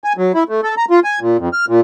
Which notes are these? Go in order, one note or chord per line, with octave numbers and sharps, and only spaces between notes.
G#5
F#3
E4
A3
A4
A#5
F4
G#5
A#2
F2
F6
A#2